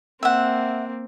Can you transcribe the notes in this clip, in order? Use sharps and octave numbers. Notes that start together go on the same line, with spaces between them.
A#3 C4 E5 F#5